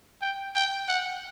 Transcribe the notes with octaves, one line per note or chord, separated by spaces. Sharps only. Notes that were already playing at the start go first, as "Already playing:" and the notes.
G5
G5
F#5